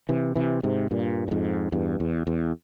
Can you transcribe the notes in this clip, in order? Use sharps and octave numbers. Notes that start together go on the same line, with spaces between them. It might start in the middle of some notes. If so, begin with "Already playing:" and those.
C3 E3
C3 E3
G#2 C3
G2 A#2
A#2
F2 G#2
E2 G2
E2
E2